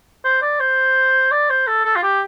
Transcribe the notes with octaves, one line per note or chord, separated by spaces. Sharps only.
C5
D5
C5
D5
C5
A4
A4
F4
G4